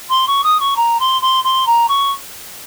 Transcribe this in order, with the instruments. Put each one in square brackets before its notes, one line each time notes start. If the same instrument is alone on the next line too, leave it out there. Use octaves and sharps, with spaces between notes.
[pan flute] C6
C#6
D#6
C#6
A#5
C6
C6
C6
A#5
C#6